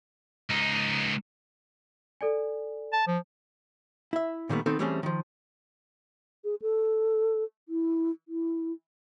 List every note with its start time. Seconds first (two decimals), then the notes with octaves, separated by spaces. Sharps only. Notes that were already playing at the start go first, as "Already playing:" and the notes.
0.49 C#2 D#4
2.21 A4 D5 G#5
2.93 A5
3.07 F3
4.13 E4 E5
4.49 A#2 D#3 G3 A3 B3
4.66 D#3 B3 C4 D#4 A4
4.79 E3 G3 A3 C4 C#4 G#4
5.03 D#3 F3
6.44 G#4
6.62 A4
7.69 E4
8.28 E4